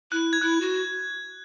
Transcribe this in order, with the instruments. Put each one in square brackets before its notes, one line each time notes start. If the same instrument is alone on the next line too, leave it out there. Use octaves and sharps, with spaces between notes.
[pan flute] E4 [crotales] F#6
[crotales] G#6
[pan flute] E4 [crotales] F#6
[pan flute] F#4